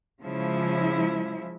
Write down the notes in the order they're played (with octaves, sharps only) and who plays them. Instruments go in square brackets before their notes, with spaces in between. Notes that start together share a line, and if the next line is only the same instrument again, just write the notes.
[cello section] C#3 F3 G#3 E4